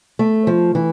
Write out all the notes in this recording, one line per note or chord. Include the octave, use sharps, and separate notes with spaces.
A3
F3
E3